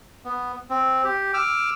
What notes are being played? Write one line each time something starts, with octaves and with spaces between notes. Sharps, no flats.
B3
C4
G4
D6 E6 F6